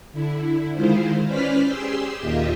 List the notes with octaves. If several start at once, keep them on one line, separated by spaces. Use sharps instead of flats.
D3 E4
D#3 G#3 E4 F4 C5
C#4 B4 C5 D5 F6 B6
G4 G#4 C6 E6
D#2 A#2 F4 G4 D#5 E5